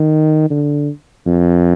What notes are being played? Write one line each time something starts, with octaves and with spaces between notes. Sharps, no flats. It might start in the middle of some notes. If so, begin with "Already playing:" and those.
Already playing: D#3
D3
F2